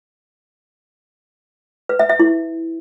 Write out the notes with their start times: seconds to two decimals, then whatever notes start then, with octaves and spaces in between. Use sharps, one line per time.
1.89 B4
1.99 E5
2.09 E5
2.20 E4